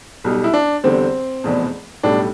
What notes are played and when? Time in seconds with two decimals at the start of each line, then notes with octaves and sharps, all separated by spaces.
0.24 B1 B2 G3
0.44 E4
0.54 D4
0.84 E2 D3 G3 C4
1.44 F1 E2 B2
2.03 B1 A2 G3 D4